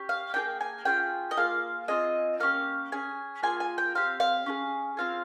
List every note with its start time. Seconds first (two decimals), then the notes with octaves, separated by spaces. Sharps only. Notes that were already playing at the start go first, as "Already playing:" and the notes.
Already playing: C#4 G4
0.09 F5
0.34 A#3 F4 G#4 G5
0.61 G#5
0.85 C#4 F4 G#4 G5
1.31 D#5
1.37 A#3 F4 G#4 F5
1.88 C4 F4 G#4 D#5
2.40 A#3 C#4 G4 F5
2.92 C#4 G#4 G#5
3.42 A#3 F4 G#4 G#5
3.60 G#5
3.78 G5
3.95 C4 G4 F5
4.20 F5
4.46 C#4 F4 G#4
4.97 C4 F4 G#4 F5